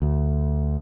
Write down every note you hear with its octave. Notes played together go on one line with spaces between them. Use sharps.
D2